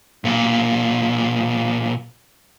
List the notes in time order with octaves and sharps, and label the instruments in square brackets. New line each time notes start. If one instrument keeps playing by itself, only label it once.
[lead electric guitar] B1 A#2